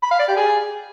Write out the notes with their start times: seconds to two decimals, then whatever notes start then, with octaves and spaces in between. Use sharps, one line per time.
0.02 B5
0.11 F5
0.19 D5
0.28 G4
0.36 G#4